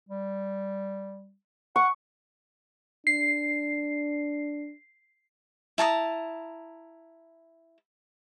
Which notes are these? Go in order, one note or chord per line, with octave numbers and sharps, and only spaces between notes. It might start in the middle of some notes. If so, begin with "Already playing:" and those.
G3
F#5 C#6
D4 C7
E4 A5 A#5 D#6